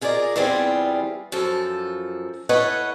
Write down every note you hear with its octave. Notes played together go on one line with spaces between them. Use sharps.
F4 G#4 A#4 B4 D5 D#5
E2 E3 G3 C4 F4 G#4
F#2 F3 A4
E4 A4 B4 C#5 D#5 F#5